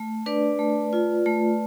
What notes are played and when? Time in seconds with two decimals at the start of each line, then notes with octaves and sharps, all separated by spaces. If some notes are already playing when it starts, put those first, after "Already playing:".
Already playing: A3
0.26 D4 B4 D5
0.59 A3
0.93 F4
1.26 A3